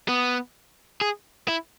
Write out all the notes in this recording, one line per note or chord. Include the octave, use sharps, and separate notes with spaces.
B3
G#4
E4